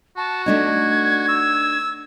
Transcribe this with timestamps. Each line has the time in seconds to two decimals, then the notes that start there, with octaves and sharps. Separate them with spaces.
0.17 F#4 A5
0.46 A3 D4 D#4 G#6
1.29 E6